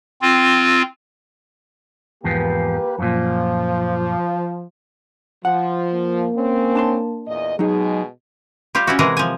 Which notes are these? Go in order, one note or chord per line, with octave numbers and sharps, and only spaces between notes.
C4 F4
E2 G#2 F3 A#3 G4 B4
F#2 A#2 F3
F3 F#5
A#3
C4 C#4
D4 A5 C6
E2 A#2 D#5
B2 F#3 G#3 D#4 G#4
G3 F4 G4
C#4 E4 F#4
C3 E3 G#3 G#4 A#4
F3 G#5